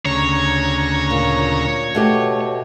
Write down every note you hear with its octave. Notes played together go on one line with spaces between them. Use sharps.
D2 C#3 C#5 A#5
A#2
B2 A3 G4